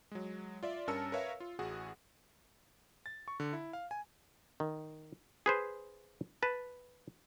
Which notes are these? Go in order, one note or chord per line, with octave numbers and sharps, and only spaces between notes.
F#3 G#3
F4 D5 E5
G2 C#4 A#4 A5 E6 C#7
A#4 B4 C#5 E5 F5
F4
A1 F#4 G#4 F#5
A6
C#6
D3
E4
F5
G#5
D#3
G#4 B4 C5
B4 A5